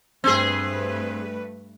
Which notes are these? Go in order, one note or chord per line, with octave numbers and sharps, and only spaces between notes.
G2 A3 C4 G#4 B4